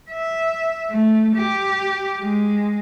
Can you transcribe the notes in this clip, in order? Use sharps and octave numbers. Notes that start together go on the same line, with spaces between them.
E5
A3
G4
G#3